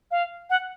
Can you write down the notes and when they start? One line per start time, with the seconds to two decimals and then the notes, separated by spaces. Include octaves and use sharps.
0.11 F5
0.50 F#5